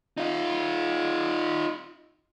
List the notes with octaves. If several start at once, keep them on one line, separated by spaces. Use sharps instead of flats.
D#4 F4